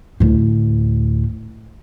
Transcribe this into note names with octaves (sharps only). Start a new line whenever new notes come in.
D2 A2